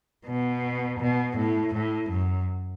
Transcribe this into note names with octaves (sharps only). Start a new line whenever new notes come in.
B2
B2
A2
A2
F#2